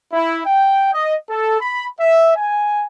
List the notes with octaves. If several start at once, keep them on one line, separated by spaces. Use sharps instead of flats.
E4
G5
D#5
A4
B5
E5
G#5